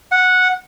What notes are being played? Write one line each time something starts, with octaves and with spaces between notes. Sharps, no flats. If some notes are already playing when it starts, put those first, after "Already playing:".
F#5